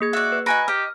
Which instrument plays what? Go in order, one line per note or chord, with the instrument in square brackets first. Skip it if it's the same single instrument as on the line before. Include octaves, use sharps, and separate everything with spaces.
[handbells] A#3 G#4 G#6
[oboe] F#4 [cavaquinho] D5 E5
[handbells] B4
[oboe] F#4 [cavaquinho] D#5 G#5 B5 [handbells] A#5 A#6 D7
[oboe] G4 [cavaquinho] D#5 [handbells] F6